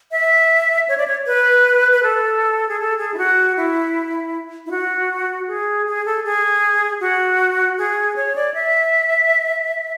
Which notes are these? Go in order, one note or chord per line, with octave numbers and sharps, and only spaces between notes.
E5
C#5
D5
C#5
B4
B4
A4
G#4
A4
G#4
E4
F#4
E4
E4
F#4
G#4
G#4
A4
G#4
F#4
G#4
C#5
D5
E5